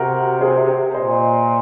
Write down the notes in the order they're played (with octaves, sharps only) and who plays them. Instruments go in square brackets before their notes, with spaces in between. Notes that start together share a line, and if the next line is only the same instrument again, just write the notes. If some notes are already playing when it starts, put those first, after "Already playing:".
Already playing: [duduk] C3 [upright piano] F#4 A#4
[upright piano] G#4 C5
[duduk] A#2 [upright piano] C5 D#5